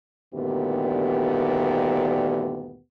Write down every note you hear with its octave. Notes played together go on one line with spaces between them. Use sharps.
D2 G2 A#2 D#3 B3 G4